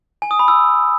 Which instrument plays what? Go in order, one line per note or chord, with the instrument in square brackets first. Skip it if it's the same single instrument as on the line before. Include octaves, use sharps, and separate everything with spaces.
[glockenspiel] G#5
D#6
B5
E6